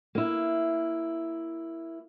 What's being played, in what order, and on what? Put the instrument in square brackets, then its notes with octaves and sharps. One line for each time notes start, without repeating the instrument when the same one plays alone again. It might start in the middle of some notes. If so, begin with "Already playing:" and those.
[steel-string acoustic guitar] A#3 E4